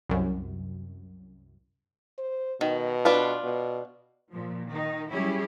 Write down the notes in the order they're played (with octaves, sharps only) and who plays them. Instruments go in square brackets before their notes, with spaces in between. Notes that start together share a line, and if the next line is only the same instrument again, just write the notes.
[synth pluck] C2 F#2
[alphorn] C5
[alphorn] B2 [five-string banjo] D#3
[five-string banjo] D4 F4 B4
[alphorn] B2
[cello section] A#2 F3
D#3 D#4
F#3 G3 C#4 E4 G4 G#4